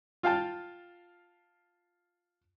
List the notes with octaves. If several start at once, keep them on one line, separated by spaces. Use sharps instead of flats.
F4 F5 G5 A5